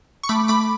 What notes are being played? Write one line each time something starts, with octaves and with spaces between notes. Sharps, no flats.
C#6
A3 B5 D6
A3 B5 D6